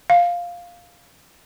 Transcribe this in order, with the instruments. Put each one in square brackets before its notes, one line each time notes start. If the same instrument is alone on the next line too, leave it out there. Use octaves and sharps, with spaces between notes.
[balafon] F5